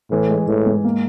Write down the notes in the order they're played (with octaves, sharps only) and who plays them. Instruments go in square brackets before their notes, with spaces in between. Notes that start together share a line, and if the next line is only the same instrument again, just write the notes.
[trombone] A2 [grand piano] E3
[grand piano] G#3
[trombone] A2 [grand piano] E3
[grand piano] G#2
A#3